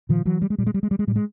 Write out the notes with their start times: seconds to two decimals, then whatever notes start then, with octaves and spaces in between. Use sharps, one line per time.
0.09 A#2 D#3 F3
0.25 E3 F#3
0.42 G3
0.50 G#3
0.58 A#2 G3
0.67 G#3
0.74 G3
0.83 G#3
0.91 G3
0.99 G#3
1.07 A2 G3
1.16 G#3